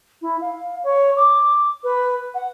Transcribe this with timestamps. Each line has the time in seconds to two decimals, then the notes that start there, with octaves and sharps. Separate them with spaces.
0.22 E4
0.41 F5
0.84 C#5
1.16 D6
1.84 B4
2.34 F#5